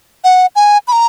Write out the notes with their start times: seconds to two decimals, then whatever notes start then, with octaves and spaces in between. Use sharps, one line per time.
0.24 F#5
0.56 G#5
0.88 B5
0.92 A#5